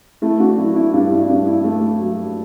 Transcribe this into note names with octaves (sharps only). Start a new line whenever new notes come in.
A3 E4
D4 F#4
F#3 E4
E4
G2 D4
E4
G2 D4
E4
A3
F#3